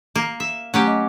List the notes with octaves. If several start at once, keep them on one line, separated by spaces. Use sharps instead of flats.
A#3
E5
F#3 A3 C#4 G4
D#5 D6